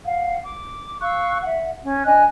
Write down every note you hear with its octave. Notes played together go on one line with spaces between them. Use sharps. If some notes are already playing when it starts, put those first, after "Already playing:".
F5 F#5
D6
F5 C#6 E6 F#6
E5 F#5
C#4
D4 D#5 G#5 F#6